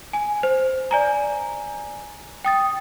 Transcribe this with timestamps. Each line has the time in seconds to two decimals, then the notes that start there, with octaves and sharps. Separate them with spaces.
0.13 G#5
0.43 C5
0.91 D5 G#5 A#5
2.45 G5 D#6 A6